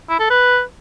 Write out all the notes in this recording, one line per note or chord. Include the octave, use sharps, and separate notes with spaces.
E4
A4
B4